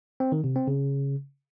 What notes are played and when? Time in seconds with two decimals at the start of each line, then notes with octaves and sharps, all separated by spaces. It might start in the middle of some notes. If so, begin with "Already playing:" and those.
0.20 C4
0.32 D#3
0.44 C3
0.56 C4
0.67 C#3